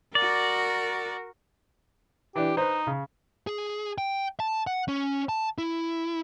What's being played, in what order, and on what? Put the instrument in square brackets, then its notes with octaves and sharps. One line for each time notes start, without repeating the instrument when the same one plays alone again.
[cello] F#4 A#4 [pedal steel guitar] D5
[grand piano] E3 D4 [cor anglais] G4
[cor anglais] D#4 [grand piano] B4 C5
[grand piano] C#3
[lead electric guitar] G#4
G5
A5
F#5
C#4
A5
E4